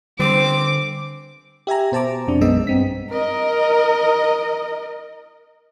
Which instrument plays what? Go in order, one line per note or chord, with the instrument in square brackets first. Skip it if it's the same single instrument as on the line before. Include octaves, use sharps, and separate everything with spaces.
[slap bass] D3 G3 [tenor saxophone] C4 [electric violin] D6
[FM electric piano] G4 E5 G#5 A#5
B2 C5 A5 A#5 D6
F2 C3 D4
B1 F#2 G#3 B3 D#5 E6
G2 C4 B6
[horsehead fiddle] A#4 D#5